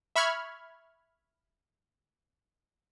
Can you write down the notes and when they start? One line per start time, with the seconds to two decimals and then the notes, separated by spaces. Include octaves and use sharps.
0.16 E5 B5 C#6 F6 G#6